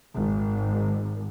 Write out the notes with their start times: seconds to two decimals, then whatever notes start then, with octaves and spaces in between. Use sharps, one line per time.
0.15 G#1